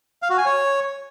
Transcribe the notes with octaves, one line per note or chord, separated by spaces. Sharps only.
F5
F#4
G#5
C#5